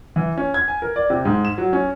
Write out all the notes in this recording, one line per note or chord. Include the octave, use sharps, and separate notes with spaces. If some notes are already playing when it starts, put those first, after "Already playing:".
E3
C#4
G#6
G#5
A#4
D5
C3
G#2
E7
F#3
C#4